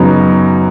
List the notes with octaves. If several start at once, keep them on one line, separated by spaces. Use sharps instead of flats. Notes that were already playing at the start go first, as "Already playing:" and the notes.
Already playing: F#2 C#3 F#3 B3 D#4